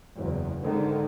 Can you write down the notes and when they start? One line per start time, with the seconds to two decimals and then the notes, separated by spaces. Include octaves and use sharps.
0.15 F#1 E2
0.62 G#2 D3 D#3 G#3